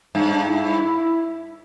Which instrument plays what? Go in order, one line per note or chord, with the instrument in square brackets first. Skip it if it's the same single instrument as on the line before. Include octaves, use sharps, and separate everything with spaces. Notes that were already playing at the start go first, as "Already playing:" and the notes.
[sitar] G2 [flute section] C#4
[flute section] D4
E4